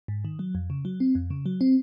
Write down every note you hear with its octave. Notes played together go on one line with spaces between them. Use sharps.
G#2
D#3
F#3
F2
C#3
F#3
C4
F2
C#3
F#3
C4